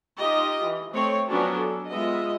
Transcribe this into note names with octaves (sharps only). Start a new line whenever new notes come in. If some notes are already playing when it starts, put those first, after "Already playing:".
D#4 F4 G4 D#5
E3
A3 C4 C#5
F3 F#3 B3 C#4 D4 F#4
A4
G#3 B3 F4 D#5 E5